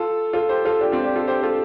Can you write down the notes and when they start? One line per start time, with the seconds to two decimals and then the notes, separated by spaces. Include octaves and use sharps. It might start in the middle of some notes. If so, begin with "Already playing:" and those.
Already playing: F4 A4
0.33 F4 A4
0.49 G4 C5
0.65 F4 A4
0.81 D4 G4
0.92 C4 F4
1.04 D4 G4
1.15 F4 A4
1.27 G4 C5
1.42 F4 A4